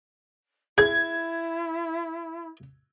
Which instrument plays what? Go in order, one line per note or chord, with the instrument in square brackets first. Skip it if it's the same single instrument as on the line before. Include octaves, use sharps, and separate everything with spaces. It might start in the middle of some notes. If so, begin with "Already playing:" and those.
[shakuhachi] E4 [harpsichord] G#4 [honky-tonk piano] G#6